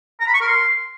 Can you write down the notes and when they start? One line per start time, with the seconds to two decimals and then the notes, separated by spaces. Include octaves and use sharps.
0.21 A#5
0.27 B5
0.34 C#6
0.41 A#4
0.48 C6